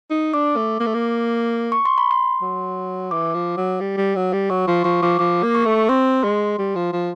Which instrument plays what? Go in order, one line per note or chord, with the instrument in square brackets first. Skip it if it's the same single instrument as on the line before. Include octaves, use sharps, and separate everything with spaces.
[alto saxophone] D#4
[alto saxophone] D4 [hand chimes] D6
[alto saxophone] A3
A#3
A3
A#3
[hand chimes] C#6
C6
B5
C6
[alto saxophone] F#3
[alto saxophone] E3 [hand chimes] D6
[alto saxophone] F3
F#3
G3
G3
F#3
G3
[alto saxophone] F#3 [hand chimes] C#6
[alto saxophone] F3 [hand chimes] C6
[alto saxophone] F3 [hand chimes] C#6
[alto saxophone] F3 [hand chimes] D6
[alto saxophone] F3 [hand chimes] D6
[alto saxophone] A#3
[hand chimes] C#6
[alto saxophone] A3
[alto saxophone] C4 [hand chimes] C6
[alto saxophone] G#3
G3
F3
F3